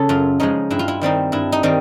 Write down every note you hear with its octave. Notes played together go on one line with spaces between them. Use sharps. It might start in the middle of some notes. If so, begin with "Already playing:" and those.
Already playing: C#3 A4
F#2 F4
C#3 F3 G#3 D#4
G2 E4
F4
E4
D#3 G3 C4 D#4 E4
G2 E4
D#4
D#3 G3 C4 D#4